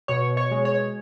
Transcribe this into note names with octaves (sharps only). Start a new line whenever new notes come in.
B2 C#5
C#5
G#3
C#5